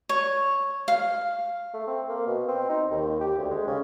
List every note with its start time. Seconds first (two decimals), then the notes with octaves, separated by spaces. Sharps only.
0.09 C#5
0.88 F5
1.74 A3
1.87 C4
2.09 A#3
2.27 B2
2.48 C4
2.69 D#4
2.91 D#2
3.20 G4
3.38 D2
3.50 G#3
3.67 C#3